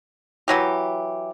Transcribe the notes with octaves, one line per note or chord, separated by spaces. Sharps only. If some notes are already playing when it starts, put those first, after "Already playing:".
E3 F#3 G4